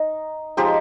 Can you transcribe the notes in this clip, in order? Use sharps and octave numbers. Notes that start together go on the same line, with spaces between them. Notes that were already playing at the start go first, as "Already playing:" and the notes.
Already playing: D#4
F3 G#3 D#4 G4